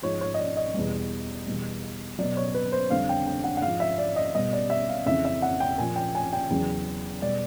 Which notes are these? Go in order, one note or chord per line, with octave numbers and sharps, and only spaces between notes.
G#2 F3 C#5
C#5
D#5
D5
D#5
E2 B2 G3
E2 B2 G3
B2 F#3 D5
C#5
B4
C5
F2 D3 G3 F5
G5
G5
F#5
F#5
G#2 F3 F5
E5
D5
D#5
B2 G3 D#5
D5
E5
F5
F2 C#3 E3 E5
E5
F#5
G5
A#2 F3 G#5
G5
G#5
G5
E2 C#3 F#3
B2 G3 D5